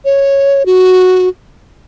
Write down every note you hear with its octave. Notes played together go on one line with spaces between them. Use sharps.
C#5
F#4